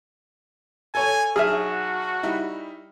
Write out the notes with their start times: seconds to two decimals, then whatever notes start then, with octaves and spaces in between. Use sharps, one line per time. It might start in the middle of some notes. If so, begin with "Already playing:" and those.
0.95 A4 C#5 G#5
1.36 B1 F#4 G#4 E5 F6
2.23 G3 D#4 E4